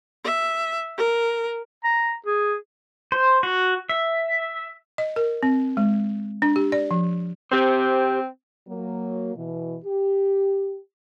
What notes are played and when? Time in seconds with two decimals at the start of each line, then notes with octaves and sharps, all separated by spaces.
0.24 E5
0.97 A#4
1.84 A#5
2.26 G#4
3.12 C5
3.43 F#4
3.89 E5
4.98 D#5
5.16 A#4
5.43 C4
5.77 G#3
6.42 D4
6.56 G4
6.72 D5
6.91 F3
7.52 C4 G4 C5
8.68 F#3 A#3
9.36 B2 E3
9.85 G4